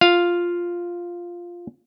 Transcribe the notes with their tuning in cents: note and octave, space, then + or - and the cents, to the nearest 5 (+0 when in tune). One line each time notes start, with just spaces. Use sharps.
F4 +0 F5 +0